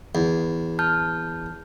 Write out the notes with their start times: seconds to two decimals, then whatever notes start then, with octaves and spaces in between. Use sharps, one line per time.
0.15 E2
0.79 A5 F6 G6